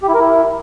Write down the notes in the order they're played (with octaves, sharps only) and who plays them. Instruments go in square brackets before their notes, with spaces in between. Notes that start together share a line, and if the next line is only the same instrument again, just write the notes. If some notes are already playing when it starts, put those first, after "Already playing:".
[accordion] G4
E4
A#4
E4